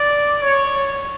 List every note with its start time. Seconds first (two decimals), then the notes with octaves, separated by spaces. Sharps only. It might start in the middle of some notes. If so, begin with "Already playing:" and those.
Already playing: D5
0.42 C#5